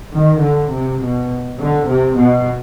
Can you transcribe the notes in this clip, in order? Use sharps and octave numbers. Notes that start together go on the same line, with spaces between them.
D#3
D3
C3
B2
D3
C3
B2